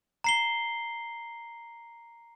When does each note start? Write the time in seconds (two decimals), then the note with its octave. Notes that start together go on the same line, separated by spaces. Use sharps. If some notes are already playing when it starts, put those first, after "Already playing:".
0.24 A#5 C7 G7